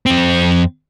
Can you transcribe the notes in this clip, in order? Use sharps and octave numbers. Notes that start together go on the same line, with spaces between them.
F2 C4